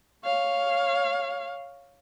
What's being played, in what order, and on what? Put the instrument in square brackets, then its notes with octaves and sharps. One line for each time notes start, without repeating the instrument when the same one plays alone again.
[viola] C#5 F5